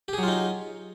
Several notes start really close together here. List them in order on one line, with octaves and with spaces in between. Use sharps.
G4 G#4 F#3 F4 D#4